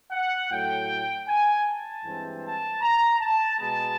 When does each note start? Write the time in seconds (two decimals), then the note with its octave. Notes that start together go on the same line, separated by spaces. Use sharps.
0.12 F#5
0.50 A2 F#3 A3 G5
1.27 G#5
1.66 A5
2.04 G2 E3 G#3 C4
2.44 A5
2.81 A#5
3.20 A5
3.58 B2 G#3 B3 A5